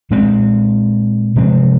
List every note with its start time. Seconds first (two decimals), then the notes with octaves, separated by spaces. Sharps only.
0.11 A#2 G#3 C4
1.36 C3 F3 G#3 C4